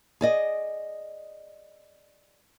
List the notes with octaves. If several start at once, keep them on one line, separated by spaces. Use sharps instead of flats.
G#4 D5 D#5